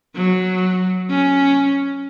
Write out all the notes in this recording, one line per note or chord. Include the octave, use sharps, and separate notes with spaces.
F#3
C#4